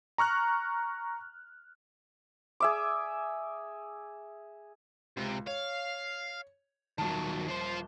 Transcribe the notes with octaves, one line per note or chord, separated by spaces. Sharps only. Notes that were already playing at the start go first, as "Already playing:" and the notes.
A#5 C#6 F6 F#6
G#4 E5 D6
C#2 C3
C#5 F5
D#1 D#3 F#3 A5
F3 C5